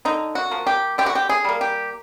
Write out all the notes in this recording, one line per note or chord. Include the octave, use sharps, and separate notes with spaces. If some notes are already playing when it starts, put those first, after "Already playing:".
D3 D#4
F#4
F3 A#3
G4
D3 G4
F#4
G4
G#4
G3 A#3
G4